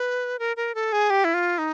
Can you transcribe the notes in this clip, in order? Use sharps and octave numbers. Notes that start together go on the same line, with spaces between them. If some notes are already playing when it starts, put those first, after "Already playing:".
Already playing: B4
A#4
A#4
A4
G#4
G4
E4
F4
D#4